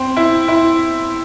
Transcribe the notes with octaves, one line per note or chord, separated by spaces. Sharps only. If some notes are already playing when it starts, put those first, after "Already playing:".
Already playing: C4
E4
E4